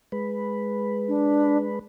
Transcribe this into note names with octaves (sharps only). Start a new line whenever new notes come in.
G#3 B4
D4